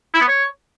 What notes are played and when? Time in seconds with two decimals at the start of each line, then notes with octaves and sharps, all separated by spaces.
0.14 E4
0.21 B3
0.28 C#5